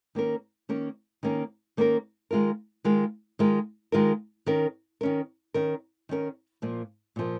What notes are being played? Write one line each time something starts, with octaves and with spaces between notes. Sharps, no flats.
D#3 A#3 C#4 A#4
D#3 A#3 C#4 A#4
D#3 A#3 C#4 A#4
D#3 A#3 C#4 A#4
D#3 G#3 F4 A#4
D#3 G#3 F4 A#4
D#3 G#3 F4 A#4
D#3 G#3 F4 A#4
D#3 C#4 A#4
D#3 C#4 A#4
D#3 C#4 A#4
D#3 C#4 A#4
A#2 F3 A#3
A#2 F3 A#3